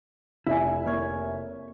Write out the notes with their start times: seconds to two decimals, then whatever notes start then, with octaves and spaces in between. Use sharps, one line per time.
0.47 F1 E4 E5 G#5
0.86 A#3 C#5